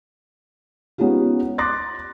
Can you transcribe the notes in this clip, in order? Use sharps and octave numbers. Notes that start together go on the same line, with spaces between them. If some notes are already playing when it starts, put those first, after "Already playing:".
G#3 B3 C#4 D#4 F4 G4
C6 D6 F#6 A6 A#6